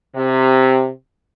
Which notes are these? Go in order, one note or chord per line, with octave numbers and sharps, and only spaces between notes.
C3